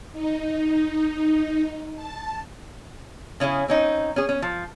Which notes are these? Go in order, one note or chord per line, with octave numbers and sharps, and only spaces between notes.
D#4
A5
C#3 C#4 E4 G#4
C4 C#4 D#4
C#4 G#4
C#4
F3